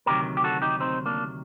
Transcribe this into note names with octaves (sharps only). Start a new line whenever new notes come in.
D2 C3 D#3 F#3 G4 A#4
G4
F#4 A4
D#4 G4
C4 D#4
A#3 D4